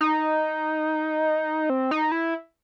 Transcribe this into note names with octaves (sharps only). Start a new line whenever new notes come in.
D#4
C4
D#4
E4